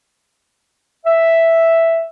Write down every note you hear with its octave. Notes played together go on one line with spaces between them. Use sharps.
E5